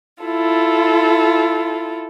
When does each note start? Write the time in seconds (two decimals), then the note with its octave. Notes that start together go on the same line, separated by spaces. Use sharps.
0.22 E4 F4 A4